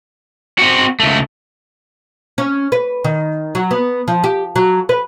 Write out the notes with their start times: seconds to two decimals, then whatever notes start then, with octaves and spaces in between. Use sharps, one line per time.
0.59 C4 F#4
1.00 C#2 A3
2.38 C#4
2.72 B4
3.04 D#3
3.55 F#3
3.71 B3
4.08 F3
4.24 G4
4.56 F#3
4.89 B4